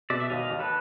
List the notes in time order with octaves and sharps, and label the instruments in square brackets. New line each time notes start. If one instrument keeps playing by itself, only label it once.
[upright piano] B2 [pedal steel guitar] D5 E5
[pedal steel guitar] E5
[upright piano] D#2 [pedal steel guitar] D#5 F5
[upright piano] D#2
[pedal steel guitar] A4 B4